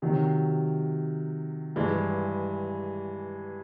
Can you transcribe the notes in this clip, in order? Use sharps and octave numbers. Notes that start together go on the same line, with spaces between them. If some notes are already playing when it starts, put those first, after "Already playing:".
C3 D#3 F#3
G2 E3 G#3